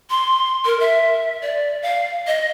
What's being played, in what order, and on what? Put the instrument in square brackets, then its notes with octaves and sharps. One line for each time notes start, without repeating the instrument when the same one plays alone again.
[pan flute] C6
A#4
E5
D5
F5
D#5